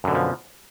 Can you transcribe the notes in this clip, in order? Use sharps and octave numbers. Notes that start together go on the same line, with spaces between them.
F#2 B2 D3 F3